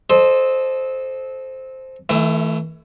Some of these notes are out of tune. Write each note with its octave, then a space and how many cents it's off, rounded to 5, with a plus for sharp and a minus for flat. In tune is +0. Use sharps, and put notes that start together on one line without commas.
A4 -25 C5 +0 D#5 -25
E3 -35 A3 +5 E4 +35